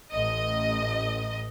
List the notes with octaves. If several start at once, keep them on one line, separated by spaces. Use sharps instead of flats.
A1 D#5